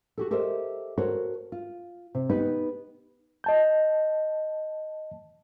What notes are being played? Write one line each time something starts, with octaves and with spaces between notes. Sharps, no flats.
F#4 G4 A4
G4 A4 A#4 C5 D#5 E5
F#4 A4 A#4 C5 C#5
F4
C3
B3 D#4 G4 B4
D#5 A5 G6